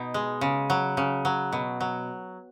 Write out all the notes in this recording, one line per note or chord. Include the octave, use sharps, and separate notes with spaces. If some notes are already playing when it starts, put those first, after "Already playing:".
Already playing: B2 D#4
G#3
C#3
F#3
C#3
F#3
B2
F#3